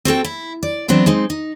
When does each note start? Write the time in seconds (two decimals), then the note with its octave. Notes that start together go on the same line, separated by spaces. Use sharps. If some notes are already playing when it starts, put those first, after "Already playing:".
0.05 C4 F#4 A4 G5
0.24 E4
0.63 D5
0.88 E3 F#3 B3 C4 D4
1.06 G#3 C4 D#4
1.30 D#4